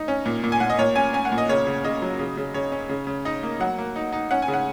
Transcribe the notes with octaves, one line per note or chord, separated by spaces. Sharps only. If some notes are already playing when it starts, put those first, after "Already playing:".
Already playing: D#4
C#4
A#2
A#2
G#5
A#2 F#5
D#5
A#2 C#5
C#4 G#5
C#4 G#5
F#5
A#2
D#5
C#3 C#5
C#3
C#3 D#5
F#3
C#3
C#3
C#3 C#5
C#4
C#3
C#3
D#4 D#5
A#3
F#3 F#5
A#3
D#4
D#4
C#4 F#5
G#5
C#3
F#5